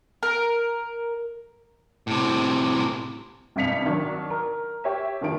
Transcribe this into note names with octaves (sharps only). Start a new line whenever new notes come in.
A#4
A2 C3
A1 G2 C3 B6 C#7 F7
D#3 F#3 D4
A#4
G4 C#5 E5
F#1 D#3 F3 D7